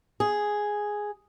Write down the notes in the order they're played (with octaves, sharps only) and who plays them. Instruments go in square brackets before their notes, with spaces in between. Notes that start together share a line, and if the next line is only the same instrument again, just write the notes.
[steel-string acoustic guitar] G#4